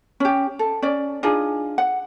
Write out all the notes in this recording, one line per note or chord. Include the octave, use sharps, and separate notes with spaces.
C#4 G4
A4
C#4 D5
D4 D#4 F4 G#4
F#5